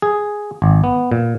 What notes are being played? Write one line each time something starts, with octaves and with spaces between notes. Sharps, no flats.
G#4
G#1
B3
A#2